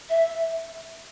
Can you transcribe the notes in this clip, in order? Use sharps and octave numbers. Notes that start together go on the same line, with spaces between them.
E5